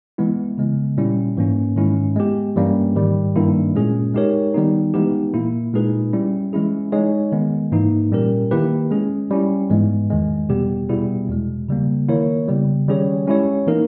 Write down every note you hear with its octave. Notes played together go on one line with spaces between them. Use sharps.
E3 G#3 B3 E4
C#3 G#3 B3
A#2 G3 C#4 E4
G#2 E3 A#3 C#4
G#2 D#3 G#3 C#4 E4
G#3 B3 G4
G2 E3 G3 A#3 C#4
G#2 D#3 G3
G2 D#3 A#3 E4
A#2 G#3 C#4 G#4
G#3 D#4 G4 A#4 C#5
D#3 G3 B3 D#4
E3 G#3 B3 D#4 G4
A#2 A#3 E4
A#2 G#3 D#4 G#4 B4
G3 C#4 E4
E3 G#3 C#4 E4 G#4
G#3 D#4 G#4 C#5
D#3 G#3 B3
G#2 E3 A#3 D#4
A#2 G3 C#4 G4 A#4
D#3 A#3 E4 G4 B4
G#3 C#4 G#4
G3 C#4 E4
G#2 E3 G#3 B3
E2 D#3 G#3
E2 B2 G3 B3 G4
B2 G3 B3 E4 G#4
E2 B2 G#3
C#3 G3 A#3
D#3 A#3 E4 A#4 C#5
C#3 G3 B3
D#3 G3 C#4 G#4 C#5
G#3 C#4 E4 G4 C#5
E3 A#3 D#4 A#4